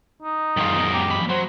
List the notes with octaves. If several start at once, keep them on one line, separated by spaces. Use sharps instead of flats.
D#4
F#2 D#3 G#3 F4
B2 A#4
G4
A#2 B5
F#3 C5